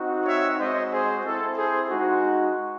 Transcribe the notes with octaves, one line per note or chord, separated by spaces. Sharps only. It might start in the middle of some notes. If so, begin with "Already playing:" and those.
Already playing: C4 D#4 F#4
C#5 E5
G#3 C4 F#4 C5 D#5
G#4 C5
C4 E4 A4
G#4 C5
G#3 D#4 F#4